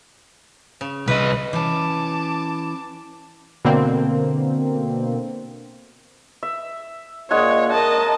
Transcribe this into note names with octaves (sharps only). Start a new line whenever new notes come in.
C#3
C2 B4 D#5
E3 C#4 A5 D6
B2 D3 A#3 C4
E5
A#2 G#3 A#3 D4 C#5 F#5 G#5
A#4 D#5 A5